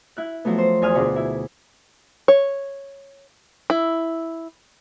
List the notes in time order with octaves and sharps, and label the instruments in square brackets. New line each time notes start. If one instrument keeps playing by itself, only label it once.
[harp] E4 F#6
F3 F#3 A3 B3
C5
E2 G#5 D#6 F6
D2 B2 D4 F4 G#4
E4
[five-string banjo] C#5
E4